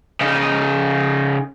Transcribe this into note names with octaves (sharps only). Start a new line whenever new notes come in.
C#3 D#4